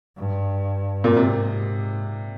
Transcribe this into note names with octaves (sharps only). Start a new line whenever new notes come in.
G2
A#2
G#2 C3